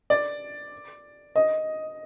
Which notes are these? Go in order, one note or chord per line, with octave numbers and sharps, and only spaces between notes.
D5
D#5